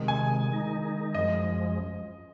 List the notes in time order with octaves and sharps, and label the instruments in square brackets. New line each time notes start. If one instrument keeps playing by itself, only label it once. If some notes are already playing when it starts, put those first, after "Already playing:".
Already playing: [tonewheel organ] C3 D#3 G#3
[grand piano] G#5
[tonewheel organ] D#3 G#3 D#4
[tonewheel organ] F#2 F3 G#3 [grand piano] D#5